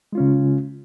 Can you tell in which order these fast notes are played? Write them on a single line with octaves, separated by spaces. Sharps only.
G#3 F4 C#4 C#3